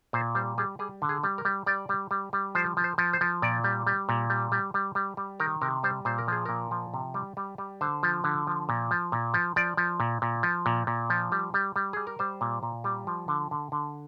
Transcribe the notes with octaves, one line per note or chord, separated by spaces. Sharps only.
A#2 C5
G3 C5
G3 G#4
G3 G#4
D3
G#4
G3
A#4
G3
G3 D5
G3
G3
G3
F3 C5
F3
C5
F3
C5
F3
A#2 D5
G3
G3
A#2
G3
G3
G3
G3
G3
D#3 A#4
C3 A#4
G3 C5
A#2 C5
A#4
F3 G#4
A#2 A#4
F3
C3
G3
G3
G3
D3 C5
F3
D3
F3
A#2
F3
A#2
F3
F3 D5
F3
A#2
A#2
F3
A#2
A#2
F3
G3
G3
G3
G3 G#4
A#4
G3 C5
A#2
A#2
G3
F3
D3
D3
D3